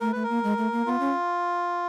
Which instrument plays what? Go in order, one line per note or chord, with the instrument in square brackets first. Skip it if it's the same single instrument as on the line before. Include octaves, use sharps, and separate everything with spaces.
[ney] A3 [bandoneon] A#4
[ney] A3 [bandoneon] B4
[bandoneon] A#4
[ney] A#3
G#3
A3
A#3
[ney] B3 [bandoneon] F4
[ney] C#4